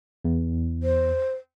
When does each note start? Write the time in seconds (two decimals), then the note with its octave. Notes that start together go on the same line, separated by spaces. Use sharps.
0.25 E2
0.83 C5